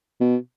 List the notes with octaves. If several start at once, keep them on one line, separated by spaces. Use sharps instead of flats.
B2